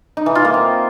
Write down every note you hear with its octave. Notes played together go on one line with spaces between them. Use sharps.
D#4
E3
F4
A#3
C4